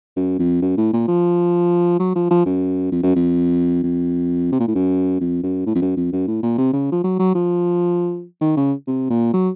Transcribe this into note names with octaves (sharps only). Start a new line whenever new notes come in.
F#2
F2
F#2
A2
A#2
F3
F#3
F3
F3
F#2
F2
F#2
F2
F2
C3
A#2
A2
F#2
F2
F#2
A2
F2
F#2
F2
F#2
A2
A#2
C3
C#3
F3
F#3
F#3
F3
D#3
C#3
C3
A#2
F#3